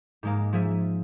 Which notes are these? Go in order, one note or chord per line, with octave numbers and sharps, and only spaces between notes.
G#2 G#3 A#3
F3 G#4 E5